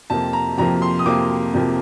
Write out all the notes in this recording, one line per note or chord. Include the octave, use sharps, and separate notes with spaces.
F2 C3 F3 A#3 A5
A#5
F2 C3 F3 A#3 A#5
C6
D#6
F2 C3 F3 A#3 D6
F2 C3 F3 A#3